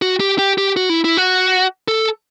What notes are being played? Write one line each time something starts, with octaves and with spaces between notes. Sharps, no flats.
F#4
G4
G4
G4
F#4
E4
E4
F#4
A4